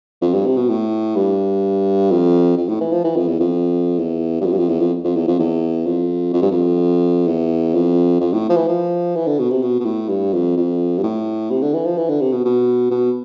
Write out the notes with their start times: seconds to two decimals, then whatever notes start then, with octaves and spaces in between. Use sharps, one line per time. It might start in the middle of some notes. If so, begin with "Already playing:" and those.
0.22 F2
0.34 G2
0.46 C3
0.57 B2
0.70 A2
1.16 G2
2.11 F2
2.57 F2
2.69 A2
2.81 E3
2.92 F3
3.04 E3
3.16 F2
3.28 E2
3.40 F2
3.99 E2
4.41 G2
4.45 F2
4.52 G2
4.57 F2
4.69 E2
4.80 F2
5.04 F2
5.16 E2
5.28 F2
5.40 E2
5.86 F2
6.33 F2
6.42 G2
6.51 F2
7.27 E2
7.75 F2
8.21 F2
8.33 A2
8.50 F3
8.56 E3
8.68 F3
9.16 E3
9.27 D3
9.39 B2
9.51 C3
9.63 B2
9.80 B2
9.86 A2
10.09 G2
10.33 F2
10.57 F2
10.98 G2
11.03 A2
11.51 C3
11.62 D3
11.74 E3
11.86 F3
11.98 E3
12.09 D3
12.21 C3
12.33 B2
12.45 B2
12.91 B2